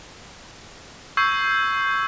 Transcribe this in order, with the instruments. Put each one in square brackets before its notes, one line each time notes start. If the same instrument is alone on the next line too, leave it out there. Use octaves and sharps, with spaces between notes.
[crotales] C#6 E6 G6 G#6 C7